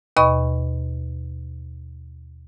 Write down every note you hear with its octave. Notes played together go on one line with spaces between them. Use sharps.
D#2 B2 D#5 B5 C#6